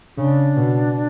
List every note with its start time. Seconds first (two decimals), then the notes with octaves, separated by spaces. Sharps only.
0.18 C#3 D4
0.56 B2